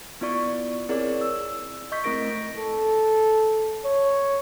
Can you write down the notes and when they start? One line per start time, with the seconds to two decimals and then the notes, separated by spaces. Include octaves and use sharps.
0.21 B3 E4 F4 D5 C#6
0.89 C4 E4 G#4 A#4 C#5 D5
1.21 E6
1.92 D#5 C#6 G6 B6
2.04 A3 C4 E4 A#4 A#6 D7
2.57 A4
3.85 C#5